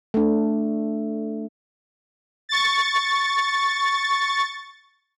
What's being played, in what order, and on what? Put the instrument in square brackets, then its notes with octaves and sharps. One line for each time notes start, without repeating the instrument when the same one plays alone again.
[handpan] A3 D4
[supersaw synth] C#6 A6